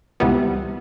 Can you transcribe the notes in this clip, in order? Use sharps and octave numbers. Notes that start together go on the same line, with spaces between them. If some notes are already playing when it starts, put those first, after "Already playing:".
C#2 C3 E3 G3 B3